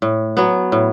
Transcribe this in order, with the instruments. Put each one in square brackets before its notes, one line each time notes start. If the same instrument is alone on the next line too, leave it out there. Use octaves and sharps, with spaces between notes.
[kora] A2
F#3 B3
A2